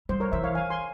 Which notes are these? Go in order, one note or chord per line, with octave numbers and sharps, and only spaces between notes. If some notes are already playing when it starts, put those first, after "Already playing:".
G3 C5
A#4 C#5
E3 C5 E5
C#5 F5
F5 G#5
G#5 C6